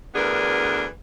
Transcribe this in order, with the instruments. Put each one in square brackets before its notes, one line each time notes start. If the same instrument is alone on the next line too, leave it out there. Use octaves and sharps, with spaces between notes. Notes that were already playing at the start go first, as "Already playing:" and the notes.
[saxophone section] D2 E3 B3 D4 G#4 A#4